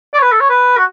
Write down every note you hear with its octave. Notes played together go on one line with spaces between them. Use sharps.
D5
C#5
B4
A4
C#5
B4
F#4